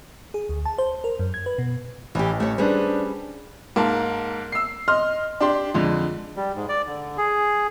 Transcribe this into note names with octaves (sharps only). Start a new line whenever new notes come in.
G#4
D2
A5
C5
A#4
F#2
G#6
B4
B2
A1 E3 G4
A3 C#5
G3 C#4 D4 G#4 B4 C5
G#2 A#3 A5
E6 C7
D#5 C6 F6
D4 G4 C6
F2 D3 G#3
G3
G#2
D5
D3
G#4